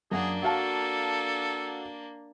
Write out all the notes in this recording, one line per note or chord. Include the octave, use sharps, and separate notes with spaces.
F#2 A#3 D4 G#4 F#5
F#4 A4 F5 A5